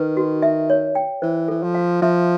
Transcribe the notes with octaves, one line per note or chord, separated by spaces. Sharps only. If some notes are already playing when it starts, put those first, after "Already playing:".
Already playing: D#3 B4
F#4
E5
C#5
G5
E3 C5
E3 A4
F3
F5
F3 E5